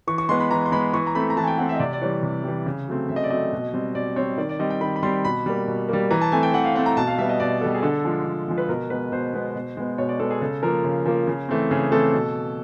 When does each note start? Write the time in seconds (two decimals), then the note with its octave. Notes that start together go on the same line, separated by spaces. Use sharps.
0.07 E3 C#6
0.18 C#6
0.29 G#3 B3 C6
0.40 B5
0.50 E3 A#5
0.66 C6
0.72 G#3 B3 B5
0.93 E3 C#6
1.07 A#5
1.15 A3 C4 B5
1.30 A#5
1.37 E3 A5
1.43 G#5
1.47 G5
1.58 A3 C4 F#5
1.69 E5
1.75 D#5
1.80 C3 D5
1.93 D5
2.01 E3 G3 C#5
2.23 C3
2.44 E3 G3
2.66 C#3
2.88 F#3 A3 C4
3.09 C#3 E5
3.16 D#5
3.24 D5
3.30 F#3 A3 C4 D#5
3.53 B2
3.74 G3 C4
3.95 B2 D5
4.16 G3 C4 C#5
4.38 D#3 D5
4.49 D5
4.59 G3 C4 D#5
4.70 G5
4.81 D#3 B5
4.96 B5
5.03 G3 C4 C6
5.24 B2 B5
5.46 G3 A#3
5.68 B2
5.89 G3 A#3
6.11 E3 A#5
6.21 A5
6.32 A3 C4 G#5
6.43 G5
6.53 E3 F#5
6.65 F5
6.75 A3 C4 F#5
6.86 A#5
6.97 B2 A5
7.07 F5
7.18 G3 B3 E5
7.29 D#5
7.40 B2 D5
7.61 G3 B3 A4
7.74 G#4
7.83 D3 A4
8.05 F3 G#3
8.26 D3
8.48 F3 G#3
8.58 B4
8.68 B2 A#4
8.90 G#3 B3 B4
9.12 B2 C5
9.33 G#3 B3
9.55 B2
9.77 G#3 B3
9.98 B2 C#5
10.09 D5
10.20 G#3 B3 A4
10.30 G#4
10.41 C#3 A4
10.63 F3 A#3 A#4
10.84 C#3
11.05 F3 A#3
11.27 C#3
11.49 E3 A3 C4
11.71 C#3 G#4
11.92 E3 A3 C4 A4
12.13 B2